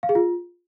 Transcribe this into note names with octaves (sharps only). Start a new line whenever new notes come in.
F5
G#4
F4